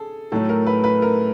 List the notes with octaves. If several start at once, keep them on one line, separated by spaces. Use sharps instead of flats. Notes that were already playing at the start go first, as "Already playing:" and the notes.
Already playing: G#4 A4
A2 F#3 A3 A4
A#4
B4
B4
A#4